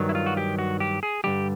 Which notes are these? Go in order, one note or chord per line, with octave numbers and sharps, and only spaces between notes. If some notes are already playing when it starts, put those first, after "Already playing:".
Already playing: G2 D#3 F#3
E4
F4
F#4
G4
F#4
G4
G#4
G2 D3 G3 G4